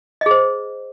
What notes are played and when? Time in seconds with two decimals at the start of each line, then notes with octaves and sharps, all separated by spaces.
0.21 D#5
0.26 G#4
0.31 C5